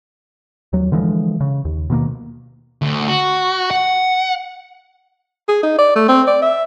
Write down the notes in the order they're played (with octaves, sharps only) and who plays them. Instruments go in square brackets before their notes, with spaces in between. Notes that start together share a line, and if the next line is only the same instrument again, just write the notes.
[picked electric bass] D#2 F#3
D3 E3 F3 G#3
C#3
D#2
B2 D#3 G#3 A#3
[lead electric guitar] D2
F#4
F#5
[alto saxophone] G#4
D#4
D5
A3
C4
D5
E5